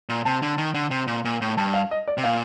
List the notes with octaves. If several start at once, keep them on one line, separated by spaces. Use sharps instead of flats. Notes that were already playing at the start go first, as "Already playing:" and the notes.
A#2
C3 A5
D3
D#3
D3
C3
A#2
A#2
A2
G2 A5
F5
D#5
D5
C3
A#2 F5